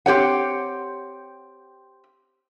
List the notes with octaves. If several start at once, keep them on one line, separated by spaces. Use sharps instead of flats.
C4 G4 C#5 F#5